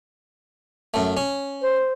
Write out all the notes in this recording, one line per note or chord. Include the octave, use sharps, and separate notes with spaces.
F#2 A3
C#4
C5